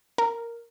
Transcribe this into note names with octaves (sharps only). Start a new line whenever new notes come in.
A#4